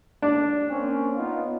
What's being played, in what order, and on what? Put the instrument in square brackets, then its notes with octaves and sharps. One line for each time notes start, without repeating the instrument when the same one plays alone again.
[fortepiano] D4
[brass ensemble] A#3 C4 C#4
B3 D#4 F4